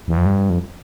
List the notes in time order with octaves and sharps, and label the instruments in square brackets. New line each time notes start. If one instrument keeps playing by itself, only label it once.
[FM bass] E2
F2
G2
F2